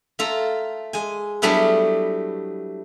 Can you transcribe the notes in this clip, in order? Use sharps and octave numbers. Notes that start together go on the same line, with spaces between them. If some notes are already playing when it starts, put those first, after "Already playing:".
A3 F4 A4 A#5
G#3 G#5
F#3 G3 A3 B3 D4 E4